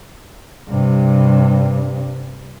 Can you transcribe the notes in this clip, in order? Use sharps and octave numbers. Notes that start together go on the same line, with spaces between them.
G2 C3